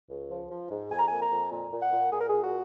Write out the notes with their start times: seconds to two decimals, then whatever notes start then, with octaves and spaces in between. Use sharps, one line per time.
0.10 C#2
0.31 F3
0.51 F3
0.71 G#2
0.91 F2 G#5
0.99 A#5
1.07 G#5
1.12 A#3
1.21 A#5
1.32 F2
1.51 A#2
1.72 A#2
1.82 F#5
1.93 A#2
2.12 A#2 G#4
2.20 A#4
2.29 A#2 G#4
2.42 F#4